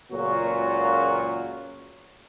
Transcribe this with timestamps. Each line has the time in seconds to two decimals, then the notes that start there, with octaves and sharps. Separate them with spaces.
0.12 C#2 A#2 C#3 F#3 A#3 F#4